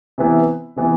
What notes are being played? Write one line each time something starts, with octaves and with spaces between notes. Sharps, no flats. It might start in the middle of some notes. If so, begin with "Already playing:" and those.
C3 E3 B3 E4
C3 E3 B3 E4